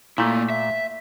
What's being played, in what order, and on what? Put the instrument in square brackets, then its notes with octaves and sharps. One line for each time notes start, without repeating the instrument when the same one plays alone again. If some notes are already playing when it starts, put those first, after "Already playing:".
[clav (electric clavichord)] A#2 A3 [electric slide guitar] A#3 E4
[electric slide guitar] E5